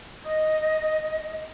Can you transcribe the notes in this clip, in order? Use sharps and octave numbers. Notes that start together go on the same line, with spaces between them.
D#5